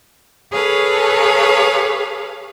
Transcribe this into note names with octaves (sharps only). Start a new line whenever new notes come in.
G#4 A4 B4 C#5 F5